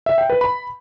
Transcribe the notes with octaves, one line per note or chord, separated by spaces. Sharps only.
E5
G5
B4
B5